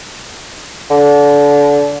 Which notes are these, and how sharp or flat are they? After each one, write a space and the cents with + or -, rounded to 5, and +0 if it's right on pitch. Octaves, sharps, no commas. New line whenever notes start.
D3 -25